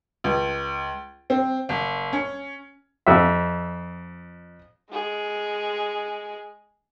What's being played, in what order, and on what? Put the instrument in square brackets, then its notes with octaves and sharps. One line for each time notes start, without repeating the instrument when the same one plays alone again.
[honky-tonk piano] C#2
C4
F#1
C#4
[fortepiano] F2 E5
[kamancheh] G#3 G#4